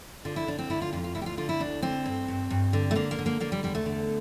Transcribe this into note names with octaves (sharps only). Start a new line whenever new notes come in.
D3 F4
E4
D3 D4
C4
D3 E4
F4
F2 F4
F4
D2 E4
G4
F4
D3 F4
E4
D2 D4
D3 C4
G2
G2
G2
D3
A3
D3 A#3
A#3
D3
A#3
D3 A#3
G3
E2 G3
A3
D3